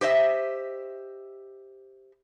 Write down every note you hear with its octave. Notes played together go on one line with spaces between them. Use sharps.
G4 C5 D#5 E5